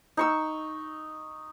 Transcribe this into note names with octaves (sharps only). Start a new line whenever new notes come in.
D#4 C#6 E6